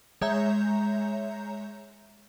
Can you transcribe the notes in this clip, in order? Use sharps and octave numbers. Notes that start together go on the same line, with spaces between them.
G#3 C#5 E5 A#5 G6